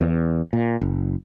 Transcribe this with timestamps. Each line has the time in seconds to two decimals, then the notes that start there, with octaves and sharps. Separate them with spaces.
0.01 E2
0.53 A#2
0.81 F#1